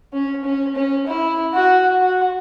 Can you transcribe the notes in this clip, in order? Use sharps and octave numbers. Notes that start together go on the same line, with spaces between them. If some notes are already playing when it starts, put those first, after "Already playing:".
C#4
C#4
C#4
E4
F#4
F#4